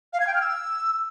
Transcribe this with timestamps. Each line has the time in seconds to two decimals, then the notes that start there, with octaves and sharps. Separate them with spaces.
0.13 F5
0.20 G#6
0.27 G5
0.34 F6
0.41 E6